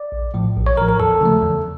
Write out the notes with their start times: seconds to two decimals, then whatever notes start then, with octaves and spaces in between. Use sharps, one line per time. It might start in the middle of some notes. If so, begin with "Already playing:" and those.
Already playing: D5
0.12 A#1
0.34 A2 F3
0.56 A#1
0.67 C#5
0.77 A2 F3 A#4
0.89 A#4
1.00 E2 A4
1.21 C#3 F3 A3
1.42 E2